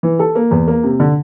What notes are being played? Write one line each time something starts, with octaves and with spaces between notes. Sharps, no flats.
E3
A4
A#3
E2
A#3
C3
D3